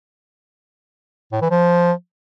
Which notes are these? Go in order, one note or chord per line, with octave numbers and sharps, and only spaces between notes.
A2
E3
F3